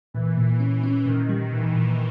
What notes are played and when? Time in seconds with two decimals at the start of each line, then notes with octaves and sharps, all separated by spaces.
0.14 A#2 E3
0.38 A#2
0.60 C#4
0.83 C#4
1.06 A#2 D#3
1.29 G3
1.52 A#2 E3
1.75 A#2